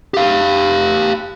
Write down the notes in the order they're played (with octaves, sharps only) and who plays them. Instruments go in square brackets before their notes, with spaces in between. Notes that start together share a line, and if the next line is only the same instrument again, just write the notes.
[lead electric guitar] G4 F5